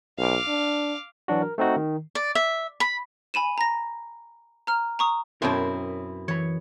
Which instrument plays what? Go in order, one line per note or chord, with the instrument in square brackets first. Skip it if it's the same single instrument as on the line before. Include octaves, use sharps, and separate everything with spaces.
[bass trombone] B1 [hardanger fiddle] F5 D6
[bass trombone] D4
[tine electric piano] E3 F#3 D4 F#4
A#4
A3 C4 D#4 F#4
D#3
[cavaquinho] D5
E5
B5
[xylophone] G#5 B5 D#7 E7
A#5 A#6
A#5 F6
A#5 C#6 D#6
[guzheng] F#2 G5 C6 [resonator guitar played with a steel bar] B2 C4 E4 [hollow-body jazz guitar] A#4 C#5
[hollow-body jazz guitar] E3 B5 [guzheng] C#5